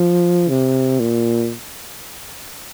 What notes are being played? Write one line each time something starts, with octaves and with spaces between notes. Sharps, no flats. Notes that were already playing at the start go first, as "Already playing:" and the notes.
Already playing: F3
C3
A#2